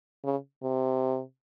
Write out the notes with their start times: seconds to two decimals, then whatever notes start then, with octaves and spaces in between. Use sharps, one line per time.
0.24 C#3
0.63 C3